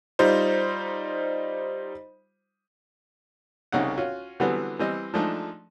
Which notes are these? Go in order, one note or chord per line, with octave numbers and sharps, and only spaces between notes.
G3 D#4 F4 C5
C2 C#3 D#4 F#5
C#4 F4 F#4
D3 E3 F#3 G3 B3 C4
E3 G3 C4 D#5
F3 G#3 A3 D4 D#4